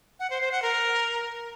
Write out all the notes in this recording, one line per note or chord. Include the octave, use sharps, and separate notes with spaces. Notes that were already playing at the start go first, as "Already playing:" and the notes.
F#5
C5
C5
F#5
A#4